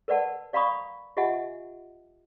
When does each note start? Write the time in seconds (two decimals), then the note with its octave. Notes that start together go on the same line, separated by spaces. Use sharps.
0.08 A#4 B4 D5 F#5 A5
0.53 D5 F5 A#5 B5 C#6 D#6
1.17 F4 G4 D#5 E5 F#5 G#5